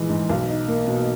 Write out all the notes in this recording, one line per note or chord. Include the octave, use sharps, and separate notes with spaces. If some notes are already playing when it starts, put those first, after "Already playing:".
Already playing: A#1 E3 G#3
G#2
B1
D#4
A#3
B2